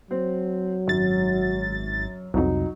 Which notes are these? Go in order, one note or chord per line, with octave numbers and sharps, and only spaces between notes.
F#3 C4
G#1 F#2 A6
C2 F2 F#3 D#4